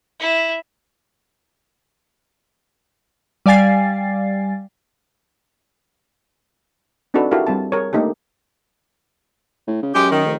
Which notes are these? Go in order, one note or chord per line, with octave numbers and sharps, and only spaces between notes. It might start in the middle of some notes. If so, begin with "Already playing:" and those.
E4
G3 D5 F5 G#5 A6 C7
C4 D4 D#4 F#4 A4 B4
E4 F#4 G4 A4 A#4 F5
G3 C4 A5
G#4 A#4 C#5
A3 A#3 D4 D#4 G4 A4
A2
C#3
F#2 G#3 G4
D#3
F1